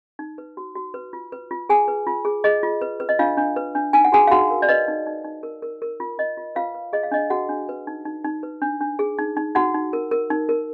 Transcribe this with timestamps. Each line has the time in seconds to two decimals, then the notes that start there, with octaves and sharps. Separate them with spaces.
0.19 D#4
0.38 B4
0.57 F#4
0.76 F#4
0.94 B4
1.13 F4
1.32 B4
1.51 F4
1.69 G#4 G#5
1.88 B4
2.07 F4
2.25 G#4
2.44 G#4 D#5
2.63 F4
2.81 B4
3.00 B4
3.09 D#5
3.19 D4 F4 F5
3.37 D4
3.56 B4
3.75 D4
3.93 D#4 G#5
4.05 F#5
4.12 F#4 G#4 G#5
4.27 F5
4.31 D#4 F#4 F#5
4.51 A#4
4.62 D5
4.69 B4 D#5
4.88 D#4
5.07 D#4
5.24 D#4
5.43 A#4
5.62 A#4
5.82 A#4
6.00 F4
6.18 F4 D#5
6.37 F4
6.55 F4 B4 F5
6.75 B4
6.93 G#4 D#5
7.03 F5
7.11 D4 D#5
7.30 F#4 G#4 F#5
7.49 D4
7.69 B4
7.87 D#4
8.05 D#4
8.24 D#4
8.43 B4
8.62 D4
8.81 D4
8.99 G#4
9.19 D#4
9.37 D#4
9.55 D#4 F#4 F#5
9.74 D#4
9.93 A#4
10.11 A#4
10.30 D#4
10.49 A#4